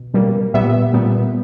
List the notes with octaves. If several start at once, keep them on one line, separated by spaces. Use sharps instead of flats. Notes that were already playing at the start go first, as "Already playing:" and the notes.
Already playing: B2
B2 G3 A#3
A#2 G3 B3 E5
A#2 G3 B3